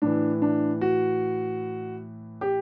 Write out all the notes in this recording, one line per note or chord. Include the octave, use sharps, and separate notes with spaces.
A2 E3 D4
D4
F#4
G4